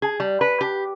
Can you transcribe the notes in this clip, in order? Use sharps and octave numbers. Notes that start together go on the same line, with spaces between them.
G#4
G3
B4
G4